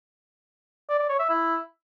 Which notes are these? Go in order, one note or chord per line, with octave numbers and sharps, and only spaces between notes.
D5
D5
C#5
E5
E4